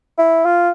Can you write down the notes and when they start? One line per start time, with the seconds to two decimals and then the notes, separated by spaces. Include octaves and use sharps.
0.18 E4
0.45 F4